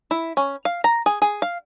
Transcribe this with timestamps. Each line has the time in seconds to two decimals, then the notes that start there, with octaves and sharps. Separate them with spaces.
0.11 E4
0.37 C#4
0.65 F5
0.84 A#5
1.06 G#4
1.22 G#4
1.42 F5